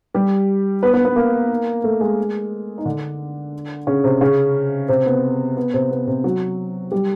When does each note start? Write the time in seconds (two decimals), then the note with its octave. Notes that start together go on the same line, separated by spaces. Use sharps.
0.14 G3 G4
0.83 B3 B4
0.94 B3 B4
1.05 B3 B4
1.16 A#3 A#4
1.84 A3 A4
2.01 G#3 G#4
2.78 D#4
2.85 D3 D4
3.87 C#3 C#4
4.04 C3 C4
4.21 C#3 C#4
4.88 C3 C4
5.06 B3
5.57 B3
5.74 C3 C4
5.90 B3
6.07 C3 C4
6.24 F#3 F#4
6.91 G3 G4